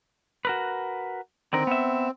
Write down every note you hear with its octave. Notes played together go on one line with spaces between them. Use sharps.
F#4 A#4 B4
D3 D#3 C4 A#4
B3 E5